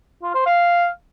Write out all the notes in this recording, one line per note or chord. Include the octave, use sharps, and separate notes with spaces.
F4
C5
F5